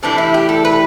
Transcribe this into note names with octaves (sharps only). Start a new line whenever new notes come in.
A2 E3 G3 D4
E4
G4
A4
B4